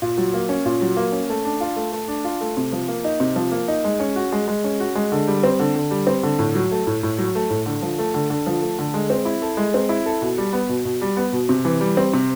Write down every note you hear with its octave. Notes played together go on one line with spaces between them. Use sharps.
A#2
F#3
A#3
C#4
A#2
F#3
A#3
C#4
A3
D4
F4
A3
A3
D4
F4
A3
C3
F3
A#3
D#4
C3
F3
A#3
D#4
G#3
C#4
F#4
G#3
G#3
C#4
F#4
G#3
D3
G3
C4
D3
D3
G3
C4
D3
A2
F#3
A3
A2
A2
F#3
A3
A2
D3
F3
A3
D3
D3
F3
A3
D3
G#3
C4
E4
A4
G#3
C4
E4
A4
B2
G3
B3
B2
B2
G3
B3
B2
C3
E3
G3
C4
C3